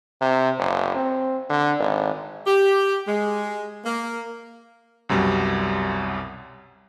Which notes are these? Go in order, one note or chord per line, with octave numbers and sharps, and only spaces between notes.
C3
F#1
C4
D3
G#1
G4
G#3
A#3
C2 F#2 B2 G3